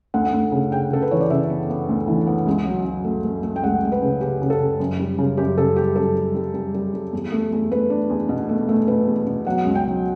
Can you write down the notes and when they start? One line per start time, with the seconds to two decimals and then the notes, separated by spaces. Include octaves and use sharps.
0.14 D2 F#5
0.32 D2
0.52 C#3
0.72 C#3 G5
0.91 C#3 A4
1.02 B4
1.11 E3 C#5
1.21 D5
1.30 C#3 E5
1.50 B3
1.69 B3
1.89 D2
2.08 E3
2.27 B3
2.47 C#2
2.65 F#3
2.85 F#3
3.04 A3
3.24 A3
3.43 A3
3.56 G5
3.63 C#2 F#5
3.83 C#2
3.92 B4
4.02 C#3
4.21 C#3 G4
4.41 C#3
4.50 A4
4.60 C#3
4.80 F#2
5.00 G3
5.18 C#3
5.37 F#2 G4
5.58 C#3 A4
5.76 G3 G4
5.96 F#2 A4
6.15 G3
6.35 G3
6.54 G3
6.75 G3
6.94 G3
7.12 E2
7.32 A3
7.52 E2
7.71 A3 B4
7.90 D4
8.10 E2
8.29 B2
8.49 A3
8.69 A3
8.88 B2 B4
9.07 E2
9.27 B2
9.46 F#3 F#5
9.65 C#2
9.75 G5
9.85 F#3